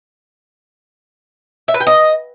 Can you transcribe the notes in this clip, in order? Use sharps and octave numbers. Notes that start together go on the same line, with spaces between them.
E5
B4
G5
D#5